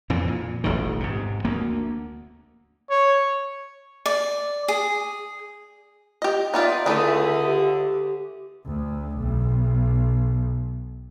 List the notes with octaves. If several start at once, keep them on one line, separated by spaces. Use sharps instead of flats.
F2 A#2 E3
A#2
D#1 A1 B2 D#3
G#2 C3
D2 A#3
C#5
D5
G#4
G4 D#5
B3 D#4 F4 D5 E5
C#2 D3 E3 A3 D#6
G4
D2
B1